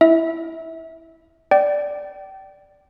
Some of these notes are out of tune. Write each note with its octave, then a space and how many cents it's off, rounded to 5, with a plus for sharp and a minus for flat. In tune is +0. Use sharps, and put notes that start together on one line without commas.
E4 +0 E5 -25
D5 +0 G5 -30